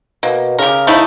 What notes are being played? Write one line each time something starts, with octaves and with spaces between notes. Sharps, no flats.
B2 A#3
C#3 G4 A#4
A3 D#4 E4